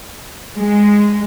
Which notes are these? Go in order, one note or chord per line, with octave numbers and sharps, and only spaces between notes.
G#3